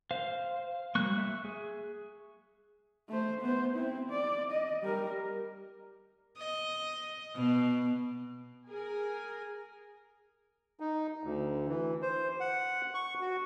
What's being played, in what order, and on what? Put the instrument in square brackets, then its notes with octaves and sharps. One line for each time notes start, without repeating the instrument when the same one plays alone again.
[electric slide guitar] C5 [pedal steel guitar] F5
[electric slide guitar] F#3 G3 A#3 [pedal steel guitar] C#6 F#6
[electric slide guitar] E5
G#4
[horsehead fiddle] A3 C5
B3 C5
C4 E4
D5
D#5
G3 A#4
[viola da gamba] D#5
B2
[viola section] G#4 A#4 G#5
[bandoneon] D#4
D2
E3
C5
F#5
C#6
F#4